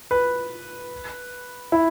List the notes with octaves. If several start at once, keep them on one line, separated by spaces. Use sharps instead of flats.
B4
E4